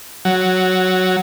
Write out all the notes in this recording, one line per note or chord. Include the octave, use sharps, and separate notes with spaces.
F#3